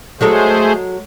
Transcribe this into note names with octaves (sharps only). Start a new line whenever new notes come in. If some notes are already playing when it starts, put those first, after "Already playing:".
F#3 G#3 A3 G#4 A4 C5